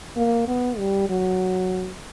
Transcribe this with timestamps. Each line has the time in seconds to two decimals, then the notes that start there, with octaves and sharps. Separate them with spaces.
0.16 A#3
0.48 B3
0.78 G3
1.09 F#3